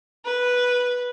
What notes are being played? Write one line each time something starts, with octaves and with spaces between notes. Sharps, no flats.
B4